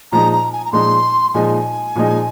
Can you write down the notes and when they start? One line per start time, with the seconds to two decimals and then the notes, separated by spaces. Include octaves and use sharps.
0.12 A#2 F3 G#3 D#4 A#5
0.33 A#5
0.53 G#5
0.65 A#5
0.72 A#2 F3 G#3 D#4 C6
1.34 A#2 F3 G#3 D#4 G#5
1.96 A#2 F3 G#3 D#4